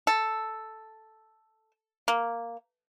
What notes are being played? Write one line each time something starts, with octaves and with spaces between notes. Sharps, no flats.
A4
A#3